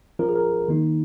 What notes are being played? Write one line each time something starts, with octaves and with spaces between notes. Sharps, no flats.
F3 C#4 F4 A#4
G#4
A#4
D#3 A#3 D#4